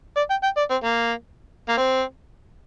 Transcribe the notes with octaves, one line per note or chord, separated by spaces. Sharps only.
D5
G5
G5
D5
C4
A#3
A#3
C4